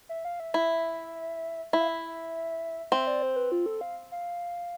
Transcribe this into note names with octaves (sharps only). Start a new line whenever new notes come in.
E5
F5
E5
E4 E5
E4 E5
F5
E5
C4 E5
D5
C5
B4
F4
A4
F5
F5